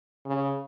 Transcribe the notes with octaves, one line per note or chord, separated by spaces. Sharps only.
C#3